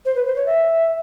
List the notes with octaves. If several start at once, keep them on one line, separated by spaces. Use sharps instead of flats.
C5
B4
C5
C#5
E5